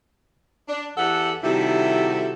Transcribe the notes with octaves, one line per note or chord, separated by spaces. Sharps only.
D4
E2 G4 A4 F#5
C3 D#3 G3 E4 F#4 A4